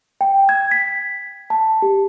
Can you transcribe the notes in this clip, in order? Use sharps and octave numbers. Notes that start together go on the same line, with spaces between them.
G5
G#6
B6
A5
G4